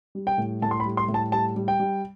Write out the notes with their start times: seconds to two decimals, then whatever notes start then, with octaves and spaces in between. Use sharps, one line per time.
0.15 G3
0.27 G5
0.38 A2
0.62 A2 A5
0.71 C6
0.80 B5
0.86 G3
0.97 C6
1.08 A2
1.14 A5
1.32 G3 A5
1.56 G3
1.68 G5
1.80 G3